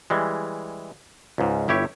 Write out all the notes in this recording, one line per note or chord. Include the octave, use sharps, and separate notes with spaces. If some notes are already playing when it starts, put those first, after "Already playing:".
E3 G3 G#3
C#2 G#2
G1 E4 G4 C#5